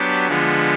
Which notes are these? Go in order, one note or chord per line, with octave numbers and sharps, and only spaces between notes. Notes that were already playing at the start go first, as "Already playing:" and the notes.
Already playing: F#3 B3 D4 G4
D3 F3 G#3 B3